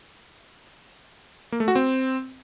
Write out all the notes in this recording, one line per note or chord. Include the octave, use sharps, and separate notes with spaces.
A#3
A3
F#4
C4